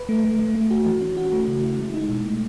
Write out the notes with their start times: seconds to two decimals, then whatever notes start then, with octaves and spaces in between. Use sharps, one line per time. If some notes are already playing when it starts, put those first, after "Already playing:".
Already playing: B4
0.09 A3
0.24 A3
0.39 A3
0.55 A3
0.71 F#4
0.86 E3
1.01 C#4
1.17 F#4
1.33 A3
1.48 C#3
1.63 E4
1.79 G#3
1.94 D#4
2.09 B2
2.25 A3